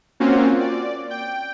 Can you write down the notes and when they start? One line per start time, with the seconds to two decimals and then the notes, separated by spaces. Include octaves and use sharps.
0.20 A#3 C4 C#4 F4 F#4
0.60 D5
1.10 G5